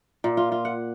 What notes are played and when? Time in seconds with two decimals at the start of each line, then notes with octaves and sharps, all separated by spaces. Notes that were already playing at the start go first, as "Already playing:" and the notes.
0.24 A#2
0.37 F4
0.52 F4
0.65 F#5